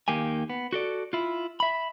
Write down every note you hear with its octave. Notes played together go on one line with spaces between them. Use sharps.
D#2 D#3 A#3 G4 G#5
B3
F#4 A4 D5
E4 F4
E5 B5